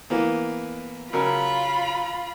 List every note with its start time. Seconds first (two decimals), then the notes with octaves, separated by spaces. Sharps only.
0.10 E3 A#3 B3
1.13 C#3 F#3 F4 A#4 B5